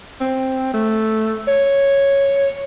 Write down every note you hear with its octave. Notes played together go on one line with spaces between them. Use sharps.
C4
A3
C#5